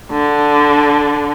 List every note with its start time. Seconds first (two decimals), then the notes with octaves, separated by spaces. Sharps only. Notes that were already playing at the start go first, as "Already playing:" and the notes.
0.11 D3